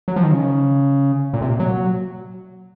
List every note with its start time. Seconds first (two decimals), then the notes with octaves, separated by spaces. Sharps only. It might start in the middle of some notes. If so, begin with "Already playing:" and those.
0.08 F#3
0.16 F3
0.23 D#3
0.32 C#3
1.34 A#2
1.41 C3
1.50 A#2
1.59 F#3